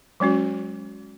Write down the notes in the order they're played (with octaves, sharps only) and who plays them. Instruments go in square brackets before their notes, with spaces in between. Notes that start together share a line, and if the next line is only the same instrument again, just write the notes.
[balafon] F#3 G#3 C#4 F#4